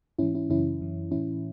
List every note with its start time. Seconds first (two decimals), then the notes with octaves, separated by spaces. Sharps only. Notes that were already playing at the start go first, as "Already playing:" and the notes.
0.18 G#2 E3 C#4 E4
0.35 C#4 E4
0.49 F#2 C#3 E3 C#4 E4
0.81 F#2 E3
1.11 A2 E3 C#4 E4